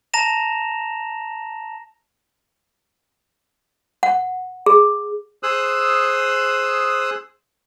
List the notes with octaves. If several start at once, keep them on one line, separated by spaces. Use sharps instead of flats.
A5 A#5 A#6 E7 F7
F#5
G#4
G#4 C5 D#6 E6 F#6